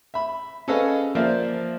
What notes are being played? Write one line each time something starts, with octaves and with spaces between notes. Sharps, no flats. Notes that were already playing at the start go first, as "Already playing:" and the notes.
E5 B5
C#4 G#4 A4 B4 D#5 F5
F3 A#3 C5 D5 E5